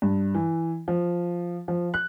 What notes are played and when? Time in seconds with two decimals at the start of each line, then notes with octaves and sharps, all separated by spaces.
0.02 G2
0.34 E3
0.88 F3
1.68 F3
1.94 F#6